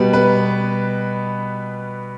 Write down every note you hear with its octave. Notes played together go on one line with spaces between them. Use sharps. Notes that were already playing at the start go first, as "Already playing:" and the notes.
Already playing: B2 G3 B3 B4
B4